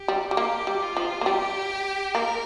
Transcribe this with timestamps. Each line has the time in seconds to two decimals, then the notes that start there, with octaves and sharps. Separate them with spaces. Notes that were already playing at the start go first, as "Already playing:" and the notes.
Already playing: G4
0.08 G3
0.31 G3
0.37 A#3 G4
0.67 G3
0.82 F4
0.97 F3
1.21 A#3
1.26 G3 G4
2.15 A#3 A#4